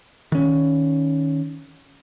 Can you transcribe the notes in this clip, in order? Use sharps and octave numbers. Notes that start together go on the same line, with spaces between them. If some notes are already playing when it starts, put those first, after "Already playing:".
D#3 C#4